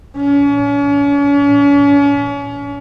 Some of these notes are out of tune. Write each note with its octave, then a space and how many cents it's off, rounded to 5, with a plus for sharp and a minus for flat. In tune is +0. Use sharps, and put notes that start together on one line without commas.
C#4 +40